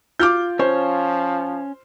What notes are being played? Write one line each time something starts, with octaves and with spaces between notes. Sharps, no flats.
F4 D6 F6 G6
F3 C#4 C5 C#5